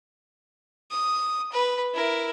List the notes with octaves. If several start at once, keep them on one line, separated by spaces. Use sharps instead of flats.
D#6
B4
E4 A#4